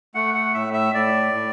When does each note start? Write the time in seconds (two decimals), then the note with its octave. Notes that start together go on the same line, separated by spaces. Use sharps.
0.15 A3 F#5
0.34 F#5
0.54 A2 E5
0.73 E5
0.94 A2 D5
1.33 A2